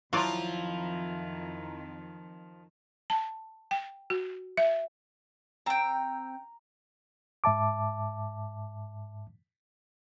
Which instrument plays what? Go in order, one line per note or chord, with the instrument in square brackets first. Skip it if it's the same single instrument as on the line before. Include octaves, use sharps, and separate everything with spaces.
[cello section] F2 D#3 [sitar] F3 F4 [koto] F#3 D5 [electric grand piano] E4 A#5
[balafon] A5
G5
F#4
E5
[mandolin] C4 G5 [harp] A#5
[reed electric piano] G#2 E5 A5 D6